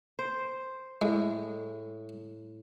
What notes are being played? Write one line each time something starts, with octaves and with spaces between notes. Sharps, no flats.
C5
A2 G#3